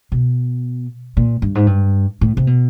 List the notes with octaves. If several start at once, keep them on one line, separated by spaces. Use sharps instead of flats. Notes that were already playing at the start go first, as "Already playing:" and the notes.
B2
A#2
G2
G#2
G2
A2
C3
B2